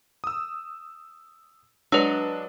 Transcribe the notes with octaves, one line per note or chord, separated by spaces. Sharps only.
D#6 E6
F#3 G#3 D4 B4 E6